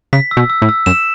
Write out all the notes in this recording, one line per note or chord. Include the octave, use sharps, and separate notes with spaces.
C#3 B6
E6
B2
E6
A2
E6
F#2 E7